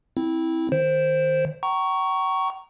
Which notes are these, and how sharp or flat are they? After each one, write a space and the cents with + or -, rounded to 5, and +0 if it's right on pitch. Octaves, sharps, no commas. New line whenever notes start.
C4 +0 E4 -15
D#3 -10 C5 +5
G5 -45 A#5 +0 C#6 +0